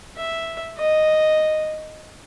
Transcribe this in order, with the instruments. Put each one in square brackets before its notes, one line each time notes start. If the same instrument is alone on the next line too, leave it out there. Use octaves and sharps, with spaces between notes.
[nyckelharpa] E5
D#5